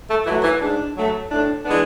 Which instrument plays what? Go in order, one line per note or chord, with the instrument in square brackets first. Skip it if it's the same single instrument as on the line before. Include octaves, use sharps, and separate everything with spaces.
[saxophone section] A3 A4
E3 F#3 E4
A3
E3 E4
G#2 D4
F#3 A3
A2 D4
E3 G#3 B3 D4